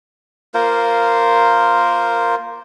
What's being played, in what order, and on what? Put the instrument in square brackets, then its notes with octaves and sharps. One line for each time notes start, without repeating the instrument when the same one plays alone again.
[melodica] A#3 F4 A#4 C5